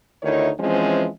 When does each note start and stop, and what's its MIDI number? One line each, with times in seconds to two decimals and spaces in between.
0.23 0.49 38
0.23 0.49 51
0.23 0.49 63
0.23 0.49 64
0.23 0.49 73
0.59 1.08 52
0.59 1.08 53
0.59 1.08 56
0.59 1.08 60
0.59 1.08 61